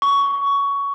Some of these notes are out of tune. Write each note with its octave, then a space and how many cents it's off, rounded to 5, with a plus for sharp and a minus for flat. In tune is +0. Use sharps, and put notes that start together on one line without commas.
C#6 +15